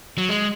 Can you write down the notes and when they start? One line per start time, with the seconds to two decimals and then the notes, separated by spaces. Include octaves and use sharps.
0.18 F#3
0.29 G#3